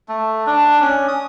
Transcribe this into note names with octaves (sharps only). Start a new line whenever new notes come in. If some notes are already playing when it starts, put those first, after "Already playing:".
A3
D4
C#4
D#6